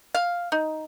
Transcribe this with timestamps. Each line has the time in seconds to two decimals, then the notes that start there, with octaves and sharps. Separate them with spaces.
0.15 F5
0.52 D#4